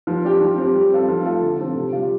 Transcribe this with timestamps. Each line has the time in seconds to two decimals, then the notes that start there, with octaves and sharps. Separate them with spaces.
0.07 F3
0.24 D4 G4
0.41 F3
0.58 C4 G4
0.75 G3
0.92 C4 F4 A4
1.08 F3
1.25 A3 F4 A4
1.42 D3
1.59 F3 C4 A4
1.76 C3
1.92 G3 F4